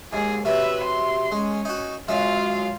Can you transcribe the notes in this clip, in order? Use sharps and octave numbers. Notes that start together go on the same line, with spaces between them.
D#2 G#2 G#4
C3 F#3 B4 E5
C6
G#3 C#4
D#4 F#4
F#2 F#3 G#3 F4 F5